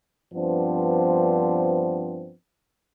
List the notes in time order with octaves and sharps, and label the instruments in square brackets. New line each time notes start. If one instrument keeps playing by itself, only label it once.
[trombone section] G2 F3 B3 C4 D4